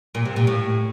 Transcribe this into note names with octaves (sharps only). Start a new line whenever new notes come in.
A#2
C3
A#2
A2